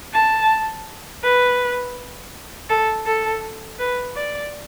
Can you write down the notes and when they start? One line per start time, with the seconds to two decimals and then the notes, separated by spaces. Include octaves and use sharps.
0.13 A5
1.23 B4
2.70 A4
3.06 A4
3.79 B4
4.16 D5